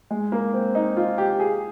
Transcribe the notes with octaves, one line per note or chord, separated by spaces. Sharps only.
G#3
A#3
C4
D#4
F4
G4
G#4